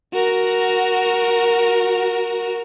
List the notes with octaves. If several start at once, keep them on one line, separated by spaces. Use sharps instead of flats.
F#4 A#4